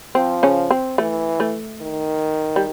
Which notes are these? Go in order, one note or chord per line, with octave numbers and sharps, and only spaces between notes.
F3 C4
C#3 C#4
C4
E3 A3
A3
D#3
G3